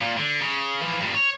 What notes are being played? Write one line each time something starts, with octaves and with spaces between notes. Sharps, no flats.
A#2
D3
C#3
E3 F3
G2 A#2
C#5